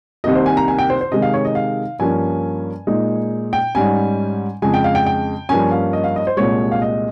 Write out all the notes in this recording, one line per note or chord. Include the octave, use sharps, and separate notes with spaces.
C2 C3 D#3 A#3 D#5
C5
G#5
A#5
G#5
G5
C5
C5
C3 D#3 G#3 D#4 D#5
F5
C#5
D#5
F5
G2 F3 A#3 C#4 G#5
A#2 G#3 D#4
G5
G#2 G3 C#4 G#5
F2 C#3 G#3 G#5
G5
F5
G5
G5
G2 F3 A#3 C#4 G#5
F5
D#5
F5
D#5
C5
C2 A#2 G#3 C#5
F5
D#5